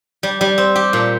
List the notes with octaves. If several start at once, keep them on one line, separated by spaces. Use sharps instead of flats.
G3
G3
C4
G4
A#2